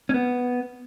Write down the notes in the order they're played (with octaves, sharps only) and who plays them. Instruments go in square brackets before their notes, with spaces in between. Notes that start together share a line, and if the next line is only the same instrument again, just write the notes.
[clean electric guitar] C#4
B3